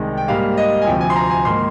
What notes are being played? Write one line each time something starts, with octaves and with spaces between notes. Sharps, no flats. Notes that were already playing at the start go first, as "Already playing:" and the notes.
Already playing: C2 C3 D#3 G#3
G5
G#2 G3 A#3 F5
D#5
G#5
D2 C3 F3 G5
G#5
C6
A#5
G#5
G#2 D#3 A#3 C6